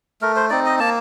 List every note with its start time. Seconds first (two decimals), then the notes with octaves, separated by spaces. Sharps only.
0.22 A3 A#4
0.36 C5
0.50 C4 D#4 D5
0.65 D#5
0.79 A#3 A5